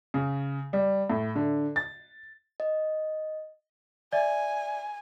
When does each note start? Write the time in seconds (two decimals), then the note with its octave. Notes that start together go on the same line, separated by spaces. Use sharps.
0.14 C#3
0.73 G3
1.10 A2
1.35 D3
1.76 A6
2.60 D#5
4.13 D5 E5 G#5